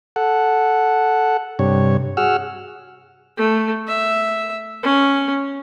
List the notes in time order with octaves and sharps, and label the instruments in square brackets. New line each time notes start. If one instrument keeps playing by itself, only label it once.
[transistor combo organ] A4 F#5
G2 C3 C#5
F#4 G#4 F#5 E6 F6
[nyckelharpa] A3
E5
C#4